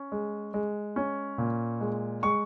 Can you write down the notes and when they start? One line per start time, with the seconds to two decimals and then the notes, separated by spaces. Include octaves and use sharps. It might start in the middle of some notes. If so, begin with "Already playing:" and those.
Already playing: C#4
0.12 G#3
0.54 G#3
0.96 C#4
1.38 A#2
1.81 G#3
2.23 G#3 C#6